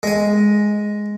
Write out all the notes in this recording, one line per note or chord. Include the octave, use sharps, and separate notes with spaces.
G#3 G#5